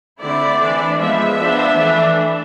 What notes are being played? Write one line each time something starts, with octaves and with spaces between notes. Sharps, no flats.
D3 A3 C4 E4 D5
E3 A3 D4
F3 G#3 B3 E5
F3 B3 D4
E3 A3 D4